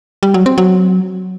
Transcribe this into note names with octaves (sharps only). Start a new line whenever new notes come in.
G3
F#3
C4
F#3